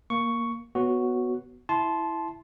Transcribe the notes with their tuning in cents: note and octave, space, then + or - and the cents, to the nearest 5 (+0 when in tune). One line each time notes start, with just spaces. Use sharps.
A#3 +5 C#6 +5
B3 +0 F#4 +0 C#5 +0
E4 +0 A5 -20 C6 +0